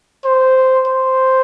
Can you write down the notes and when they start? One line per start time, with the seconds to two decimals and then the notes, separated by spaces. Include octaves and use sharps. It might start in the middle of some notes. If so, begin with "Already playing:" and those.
0.24 C5
0.87 C5